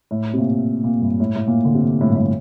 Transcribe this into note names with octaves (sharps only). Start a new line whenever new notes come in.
A2
C3
A#2
A#2
G2
A2
A2
A#2
D3
C3
A2
G2
A2